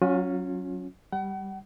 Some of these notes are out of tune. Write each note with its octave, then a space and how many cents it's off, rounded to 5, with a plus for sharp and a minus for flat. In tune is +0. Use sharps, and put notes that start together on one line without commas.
F#3 +0 C#4 +0 F4 +40
G3 +0 F#5 +40